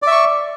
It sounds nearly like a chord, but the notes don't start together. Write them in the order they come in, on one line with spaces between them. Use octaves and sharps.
D5 E5 C#6